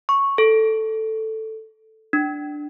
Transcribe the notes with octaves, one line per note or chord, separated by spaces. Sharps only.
C#6
A4
D4